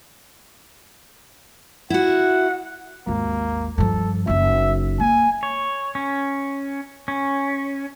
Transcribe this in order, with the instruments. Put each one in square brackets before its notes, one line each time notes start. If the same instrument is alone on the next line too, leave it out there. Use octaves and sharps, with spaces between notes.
[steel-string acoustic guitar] E4 F#4 [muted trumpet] F#5
[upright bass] G#1 D#2 [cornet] A#3
[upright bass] G2 F3 [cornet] A4
[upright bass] F#1 D#4 [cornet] E5
[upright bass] A#3 [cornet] G#5
[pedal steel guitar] C#5
C#4
C#4